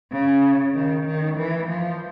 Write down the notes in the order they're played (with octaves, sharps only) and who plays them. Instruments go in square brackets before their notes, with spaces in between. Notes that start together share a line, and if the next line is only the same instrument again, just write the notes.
[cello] C#3
D#3
D#3
E3
F3